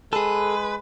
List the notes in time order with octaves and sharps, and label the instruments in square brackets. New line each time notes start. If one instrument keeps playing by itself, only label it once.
[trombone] G#3 [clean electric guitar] G#4 A4 [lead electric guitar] B4